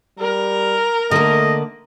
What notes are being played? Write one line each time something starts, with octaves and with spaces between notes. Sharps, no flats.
G3 A#4
D3 A3 A#3 D#5